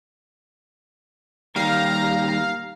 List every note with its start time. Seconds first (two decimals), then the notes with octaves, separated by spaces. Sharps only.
1.56 D#2 G3 F5 A#5